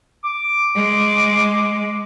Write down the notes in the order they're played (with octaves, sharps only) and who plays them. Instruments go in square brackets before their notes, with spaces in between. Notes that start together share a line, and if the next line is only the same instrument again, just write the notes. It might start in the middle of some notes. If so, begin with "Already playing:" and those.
[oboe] D6
[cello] G#3